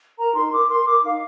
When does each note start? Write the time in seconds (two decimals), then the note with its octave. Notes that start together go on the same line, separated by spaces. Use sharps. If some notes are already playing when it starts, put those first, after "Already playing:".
0.17 A#4 A#5
0.34 D#4 C6
0.51 A#4 D6
0.69 A#4 C6
0.85 A#4 D6
1.03 D#4 F5